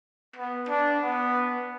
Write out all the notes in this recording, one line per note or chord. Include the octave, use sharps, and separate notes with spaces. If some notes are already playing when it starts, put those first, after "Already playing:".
B3
D4
B3